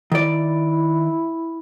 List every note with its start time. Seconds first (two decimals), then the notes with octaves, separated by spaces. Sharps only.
0.12 D#3 E4 D5